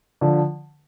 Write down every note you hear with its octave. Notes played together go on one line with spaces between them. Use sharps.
D3 F3